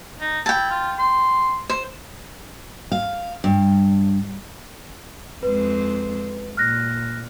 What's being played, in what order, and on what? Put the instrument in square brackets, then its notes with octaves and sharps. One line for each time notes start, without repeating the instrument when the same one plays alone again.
[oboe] D#4
[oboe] E4 [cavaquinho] G5 A5
[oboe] F4
C6
[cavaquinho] C5
[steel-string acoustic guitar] F5
G2
[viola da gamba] F2 G#3 C4 [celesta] B4
[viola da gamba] A#2 [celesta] F6 F#6 A#6